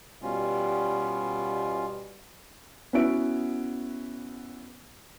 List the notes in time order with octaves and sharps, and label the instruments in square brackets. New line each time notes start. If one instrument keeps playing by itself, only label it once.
[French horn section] B2 G3 [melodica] C#4 F4
[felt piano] B3 C#4 E4 F#4 E5 D7